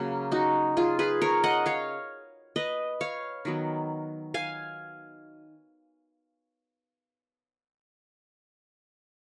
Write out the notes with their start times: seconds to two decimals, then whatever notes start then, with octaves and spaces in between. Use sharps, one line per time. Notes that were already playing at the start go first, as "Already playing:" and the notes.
Already playing: C#3 F#3 A#3
0.32 D#4 F#4
0.77 F4 G#4
0.99 G#4 B4
1.22 A#4 C#5
1.43 D#5 F#5
1.66 C#5 F5
2.56 B4 D#5
3.01 C#5 F5
3.45 D#3 F#3 B3
4.34 F5 G#5